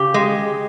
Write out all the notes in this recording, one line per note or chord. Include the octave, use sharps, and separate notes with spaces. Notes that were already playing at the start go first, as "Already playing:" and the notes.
Already playing: C#3 G4
G#3